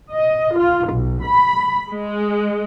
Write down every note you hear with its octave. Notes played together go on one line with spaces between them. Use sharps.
D#5
F4
B1
B5
G#3